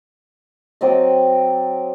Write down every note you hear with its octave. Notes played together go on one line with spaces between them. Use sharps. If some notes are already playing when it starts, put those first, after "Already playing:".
F#3 C4 D5 D#5